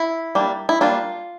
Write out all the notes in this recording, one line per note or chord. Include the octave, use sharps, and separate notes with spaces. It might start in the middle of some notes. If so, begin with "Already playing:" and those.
Already playing: E4
G3 A#3 D4
E4
G3 A#3 D4 F4